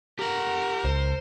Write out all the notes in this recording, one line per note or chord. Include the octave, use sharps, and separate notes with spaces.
G4 A#4 F#5
C#2 C5